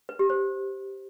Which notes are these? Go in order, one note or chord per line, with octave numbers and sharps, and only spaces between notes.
B4
G4
C5